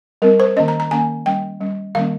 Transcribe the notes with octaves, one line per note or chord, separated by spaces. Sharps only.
G3 C4 A#4
C5
D#3 A#3 C#4 D#5
A#5
A#5
D#3 A#3 C#4 G#5
G3 C#4 G5
G3 C#4
D#3 G3 A#3 C#4 F5